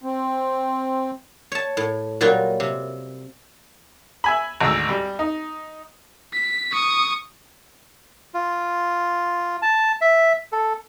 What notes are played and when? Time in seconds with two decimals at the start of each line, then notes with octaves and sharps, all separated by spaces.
0.03 C4
1.52 C#5 A5
1.77 A2
2.21 A#2 F#3 G3 F4 F#4 A#4
2.60 C3
4.24 E5 G#5 B5
4.61 G#1 D2 E6
4.89 G3
5.19 D#4
6.33 B6
6.72 C#6 D#6
8.34 F4
9.62 A5
10.01 E5
10.52 A4